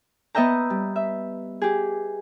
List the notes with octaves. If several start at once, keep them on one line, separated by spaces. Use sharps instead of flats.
B3 B4 D#5 E5 G5 A#5
G3
E5
G4 G#4